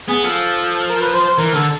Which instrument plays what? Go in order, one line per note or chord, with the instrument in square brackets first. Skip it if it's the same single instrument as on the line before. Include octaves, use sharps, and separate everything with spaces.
[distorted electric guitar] B3 [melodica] G#4
[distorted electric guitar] F3 [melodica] A4
[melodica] A#4
B4
C5
C5
[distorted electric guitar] E3 [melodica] A#4
[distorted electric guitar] D3 [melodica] A4